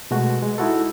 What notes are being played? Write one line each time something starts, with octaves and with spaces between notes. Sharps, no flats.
B2 G#3 A3 F#4
G#3
D#4 E4 F#4 A4